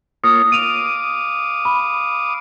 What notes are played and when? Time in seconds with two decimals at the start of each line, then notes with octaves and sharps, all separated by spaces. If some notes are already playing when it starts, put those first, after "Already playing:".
0.24 A#3 F4 C#5 D#6
0.52 F5 D6 D#6 D#7 F7
1.65 B5